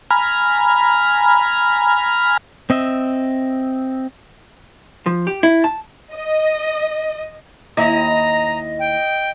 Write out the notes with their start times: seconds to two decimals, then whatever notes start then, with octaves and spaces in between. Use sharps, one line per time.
0.11 G#5 A#5 B5 F6
2.70 C4 D#5 E5
5.06 F3
5.27 G4
5.43 E4
5.64 A5
6.14 D#5
7.77 D#2 E4 D#5 A#5
8.79 G5